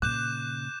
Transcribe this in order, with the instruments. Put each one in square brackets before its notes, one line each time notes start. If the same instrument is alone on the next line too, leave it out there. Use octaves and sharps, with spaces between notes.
[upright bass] A#2 C#3 [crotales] D6 G6 E7 [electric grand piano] F#6